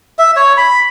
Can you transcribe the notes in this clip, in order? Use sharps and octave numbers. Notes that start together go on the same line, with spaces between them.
E5
C#5
B5